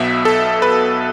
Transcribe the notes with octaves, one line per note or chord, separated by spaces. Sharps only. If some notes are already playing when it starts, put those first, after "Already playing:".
Already playing: B1 B2 B3 E5
A4
B4